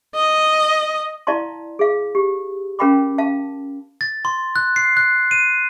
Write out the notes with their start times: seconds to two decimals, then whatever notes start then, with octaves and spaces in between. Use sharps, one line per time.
0.15 D#5
1.27 E4 D5 F5 A5 C6
1.79 G#4 F5
2.15 G4
2.79 C#4 A#4 F5 G5 B5 D6
3.18 F5 A5
4.01 A6
4.25 C6
4.56 F#6
4.76 C7
4.97 F#6
5.31 D#7